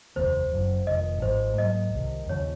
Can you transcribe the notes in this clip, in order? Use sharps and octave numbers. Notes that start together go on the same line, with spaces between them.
F1 D#2 D#3 A#3 C5
F#1 F#2 F3
F1 F2 D#3 D#5
G#1 G#2 F3 G#3 C5
G#2 F#3 A#3 D#5
C2 C3 D#3
D#2 C#3 F3 C#5